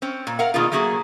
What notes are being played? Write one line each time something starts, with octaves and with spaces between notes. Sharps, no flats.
C4 C#4
A#2
A#4 F5 F#5
B2 D#3 G#3 A#3 D4 F4
F#3 A3 A#3 F#4 G#4